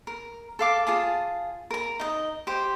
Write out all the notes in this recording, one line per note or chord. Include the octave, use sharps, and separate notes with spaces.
A#4
A4 F5 D6
F4 G#4 A5
A#4 A#5
D#4 D#5
G4 C5